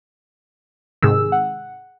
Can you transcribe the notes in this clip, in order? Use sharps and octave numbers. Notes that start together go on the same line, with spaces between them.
G#2 C3 D#3 G#4 E6
F#5